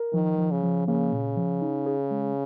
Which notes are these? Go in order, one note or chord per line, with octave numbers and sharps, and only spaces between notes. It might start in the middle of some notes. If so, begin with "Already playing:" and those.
Already playing: A#4
D#3 F3
F3
C#3
F3
C#3 A#3
A#2
F3
D#4
G#4
G#3